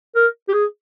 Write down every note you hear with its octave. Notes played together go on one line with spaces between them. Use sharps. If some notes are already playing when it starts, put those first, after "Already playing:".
A#4
G4
G#4